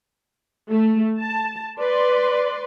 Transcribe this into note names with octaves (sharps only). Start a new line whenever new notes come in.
A3
A5
B4 D5 C6